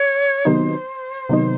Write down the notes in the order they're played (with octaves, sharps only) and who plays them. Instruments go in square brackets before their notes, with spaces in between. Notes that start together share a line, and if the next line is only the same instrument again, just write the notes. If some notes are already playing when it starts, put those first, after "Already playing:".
Already playing: [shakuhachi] C#5
[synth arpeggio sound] C3 D#3 F#3 B3 D#4 [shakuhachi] C5
[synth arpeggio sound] C3 D#3 F#3 B3 D#4